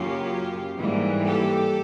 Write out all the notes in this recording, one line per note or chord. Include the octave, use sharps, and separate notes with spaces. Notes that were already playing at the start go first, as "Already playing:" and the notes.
Already playing: F#2 C#3 F#3 A#3 C#4 F4 G4
G#2 E3 G3 A#3
G4 A4